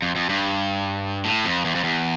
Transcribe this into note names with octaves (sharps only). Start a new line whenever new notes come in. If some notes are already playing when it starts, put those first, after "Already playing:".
F2
F2
G2
A2
F2
E2
F2
E2